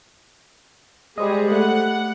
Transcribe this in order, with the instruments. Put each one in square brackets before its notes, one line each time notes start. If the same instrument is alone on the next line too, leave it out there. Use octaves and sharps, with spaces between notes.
[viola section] G3 G#3 G#4 [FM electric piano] G4 C5 D#5
[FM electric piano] A3 [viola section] F#5